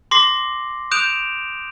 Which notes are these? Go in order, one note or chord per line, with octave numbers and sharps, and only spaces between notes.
C6 D6 A#6 C7
D#6 F#6 G6 D7 E7 F7